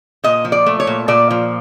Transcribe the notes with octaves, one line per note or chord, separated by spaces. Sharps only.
A#2 D#5
F3
D5
A3
C#5
A#2
A#2 D5
F3